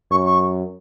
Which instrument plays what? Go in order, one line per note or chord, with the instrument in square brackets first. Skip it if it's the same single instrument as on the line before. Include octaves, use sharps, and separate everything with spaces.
[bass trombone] F#2 [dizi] C#6
[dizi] C#6